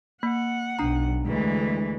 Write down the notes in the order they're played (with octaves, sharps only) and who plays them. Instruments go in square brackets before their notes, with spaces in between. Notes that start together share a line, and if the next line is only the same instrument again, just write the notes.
[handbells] A#3 [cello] F#5
[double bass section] B1 [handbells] D4 A#5
[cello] D2 E3 [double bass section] G#3